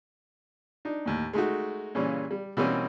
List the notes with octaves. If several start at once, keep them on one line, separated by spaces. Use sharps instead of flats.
D4 D#4
D#2 A2
G#3 A3 D#4 F#4
A#2 C#3 E3 G3 C#4
G3
B2 E3 G3 A#3 C4 C#4